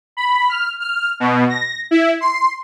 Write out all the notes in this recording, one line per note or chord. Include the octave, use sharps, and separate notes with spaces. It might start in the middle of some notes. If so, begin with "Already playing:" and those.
B5
F6
F6
B2
A#6
E4
C6